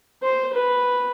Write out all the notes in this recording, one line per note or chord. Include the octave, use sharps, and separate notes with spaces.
C5
B4